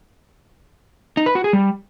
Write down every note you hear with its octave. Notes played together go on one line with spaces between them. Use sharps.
D#4
B4
F#4
G#4
G3